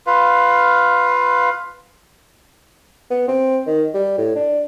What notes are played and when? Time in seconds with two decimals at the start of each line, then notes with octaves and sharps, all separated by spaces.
0.07 F4 B4 F5
3.10 B3
3.28 C4
3.66 D#3
3.94 G3
4.18 A2
4.35 D4